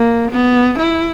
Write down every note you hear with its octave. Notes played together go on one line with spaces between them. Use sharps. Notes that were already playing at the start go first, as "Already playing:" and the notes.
Already playing: A#3
B3
E4